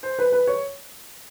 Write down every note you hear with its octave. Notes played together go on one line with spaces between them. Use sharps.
C5
B4
B4
C#5